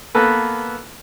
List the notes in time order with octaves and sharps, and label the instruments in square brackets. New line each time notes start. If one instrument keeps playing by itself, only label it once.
[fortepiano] A#3 B3 A4 B4